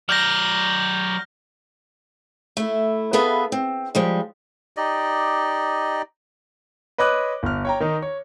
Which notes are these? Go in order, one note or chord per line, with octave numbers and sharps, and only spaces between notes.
F#3 D5 F6 G6 A#6
A3 E4
B3 G#4 A4 B4 E5 F5
C4
F3 G3 G#3
D#4 G4 D5 D#5
B4 C#5 D#5 B5 D6 F#6
G1 F6
C#5 G5 A#5
D#3 D#4
C#5